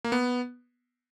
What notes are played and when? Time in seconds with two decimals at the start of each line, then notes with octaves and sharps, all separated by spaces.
0.04 A#3
0.12 B3